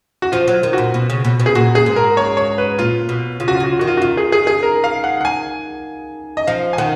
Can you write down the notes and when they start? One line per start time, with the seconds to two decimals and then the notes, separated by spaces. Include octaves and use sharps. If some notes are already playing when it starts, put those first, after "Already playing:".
0.22 F#4
0.32 F3 F4
0.48 F#3
0.53 F4
0.63 D#3
0.73 A#2 F#4
0.94 B2
1.10 C#3
1.25 B2
1.40 B2
1.46 G#4
1.55 A#2 F#4
1.75 G#4
1.86 G#2
1.96 A#4
2.17 C#5
2.37 C#5
2.58 B4
2.79 A#2 F4
3.09 B2
3.40 C#3 F4
3.48 F#4
3.55 F4
3.60 C#3 F#4
3.71 F4
3.79 D#3 F#4
3.87 F4
3.97 F#4
4.01 D#3 F4
4.17 G#4
4.32 G#4
4.47 G#4
4.63 A#4
4.84 F5
5.04 F#5
5.21 F#5
5.25 G#5
6.37 D#5
6.47 F3 F5
6.73 G#5
6.78 D#3 F#5